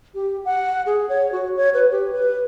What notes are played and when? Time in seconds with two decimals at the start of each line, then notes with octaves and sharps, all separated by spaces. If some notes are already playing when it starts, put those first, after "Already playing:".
0.14 G4
0.45 F#5
0.86 G#4
1.09 C#5
1.32 F#4
1.57 C#5
1.74 B4
1.91 G4
2.12 B4